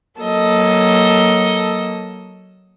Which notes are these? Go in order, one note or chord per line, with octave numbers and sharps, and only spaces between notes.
F#3 A#3 A4 D#5